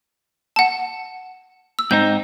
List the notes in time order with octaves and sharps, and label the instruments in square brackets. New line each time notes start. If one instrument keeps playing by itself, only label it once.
[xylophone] F#5 A5
E6
[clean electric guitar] G#2 C4 D#4 [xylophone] G6